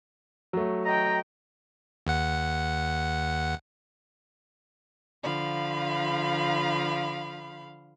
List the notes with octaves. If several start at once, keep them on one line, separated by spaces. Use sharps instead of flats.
F#3 A3
D#5 G5 A#5
D#2 F#5
D3 F3 F5 B5